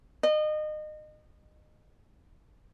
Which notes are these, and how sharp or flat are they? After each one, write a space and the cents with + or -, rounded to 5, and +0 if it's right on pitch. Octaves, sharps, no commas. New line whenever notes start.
D#5 -30